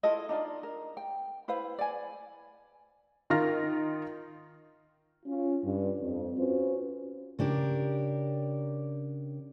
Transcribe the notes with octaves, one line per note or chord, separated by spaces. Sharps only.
E4 F4 A4 D#5
D4 D#4 F4 D5
A#4
G5
E4 B4 C5 F5
D5 G#5
D#3 F4 A#4 F6 A#6
C#4 F4
G2
F2
C#4 F4 F#4 B4 C5
C#3 D4 G4 A#4